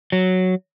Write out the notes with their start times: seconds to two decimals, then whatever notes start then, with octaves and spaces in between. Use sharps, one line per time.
0.12 F#3